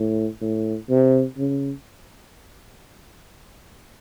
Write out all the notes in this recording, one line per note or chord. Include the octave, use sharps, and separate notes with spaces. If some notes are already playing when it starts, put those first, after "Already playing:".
Already playing: A2
A2
C3
C#3